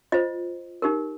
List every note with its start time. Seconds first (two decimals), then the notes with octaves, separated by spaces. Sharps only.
0.12 F4 C5 D#5
0.82 D#4 G4 A#4